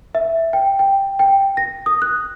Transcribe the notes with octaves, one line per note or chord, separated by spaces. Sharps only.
E5
G5
G5
G5
A#6
D#6
F#6